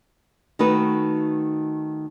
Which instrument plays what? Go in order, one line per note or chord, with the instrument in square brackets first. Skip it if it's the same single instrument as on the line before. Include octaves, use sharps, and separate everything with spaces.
[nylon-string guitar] D#3 A3 D#4 F#4 B4